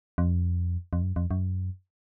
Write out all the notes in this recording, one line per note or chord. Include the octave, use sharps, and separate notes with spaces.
F2
F2
F#2
F2
F#2